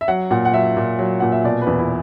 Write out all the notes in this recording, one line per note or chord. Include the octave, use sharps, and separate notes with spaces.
E5
F#3 F#5
A#2 F#5
F#5
F#3 E5
A#2
F#3
A#2 F#5
E5
B2 D5
B4
E2
E4